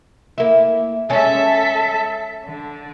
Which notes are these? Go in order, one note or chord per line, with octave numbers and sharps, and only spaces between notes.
A#3 E4
G#3 C#4 A4 E5
D3